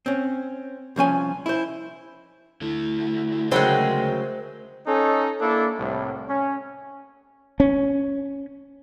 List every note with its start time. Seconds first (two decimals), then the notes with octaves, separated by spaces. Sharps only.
0.06 C4 C#4
0.96 C2 F3 C#4 G#5
1.46 E4 C5
2.61 D3 A3 E4
3.51 C#3 F#3 G#3 A#4 C5 E5 G5
4.86 C#4 D#4 A4
5.41 A#3 D4 E4 A4
5.78 C2 A2
6.28 C#4
7.60 C#4